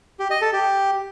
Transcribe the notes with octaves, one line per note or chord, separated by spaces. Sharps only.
G4
D#5
A4
G4